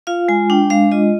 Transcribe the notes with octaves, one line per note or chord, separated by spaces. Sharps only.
F4 F5
G#3 G#5
D4 G5
G#3 F5
F4 D#5